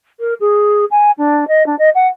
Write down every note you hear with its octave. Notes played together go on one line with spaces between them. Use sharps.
A#4
G#4
G#5
D4
D#5
D4
D#5
F#5